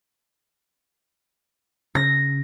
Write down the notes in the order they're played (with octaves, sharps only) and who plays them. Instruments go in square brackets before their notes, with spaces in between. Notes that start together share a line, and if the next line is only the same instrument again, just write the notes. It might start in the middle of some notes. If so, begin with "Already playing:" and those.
[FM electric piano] C#3 [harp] A#6